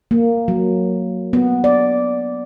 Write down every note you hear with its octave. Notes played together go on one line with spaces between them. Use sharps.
A#3
F#3
B3
D5